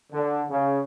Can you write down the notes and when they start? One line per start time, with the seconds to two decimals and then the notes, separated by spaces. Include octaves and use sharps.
0.12 D3
0.50 C#3